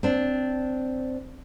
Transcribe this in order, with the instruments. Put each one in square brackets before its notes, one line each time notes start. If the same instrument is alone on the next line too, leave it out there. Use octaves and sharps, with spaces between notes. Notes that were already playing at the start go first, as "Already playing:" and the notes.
[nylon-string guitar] C4 D4